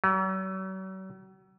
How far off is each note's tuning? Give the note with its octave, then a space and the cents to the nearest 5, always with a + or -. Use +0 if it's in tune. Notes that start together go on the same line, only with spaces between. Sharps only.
F#3 +45